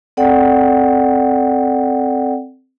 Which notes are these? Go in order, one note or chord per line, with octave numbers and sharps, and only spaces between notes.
C4 A4 D5 F#5 G5